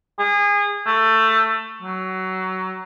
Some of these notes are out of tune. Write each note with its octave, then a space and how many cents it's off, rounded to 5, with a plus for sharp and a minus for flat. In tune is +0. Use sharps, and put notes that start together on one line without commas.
G#4 -25
A3 +15
F#3 +20